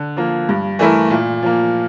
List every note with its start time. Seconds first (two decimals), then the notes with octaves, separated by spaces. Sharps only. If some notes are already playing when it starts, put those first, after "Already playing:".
Already playing: D3
0.17 F3 A#3
0.49 G2
0.79 E3 A3 E4 A#4
1.10 A#2
1.42 F3 A#3